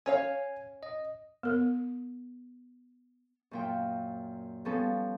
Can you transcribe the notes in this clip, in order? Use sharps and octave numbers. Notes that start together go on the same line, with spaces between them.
C#4 C#5 F5 G#5
D#5
B3 A#4
F#2 A#2 G5
F3 G3 B3 C#4 A4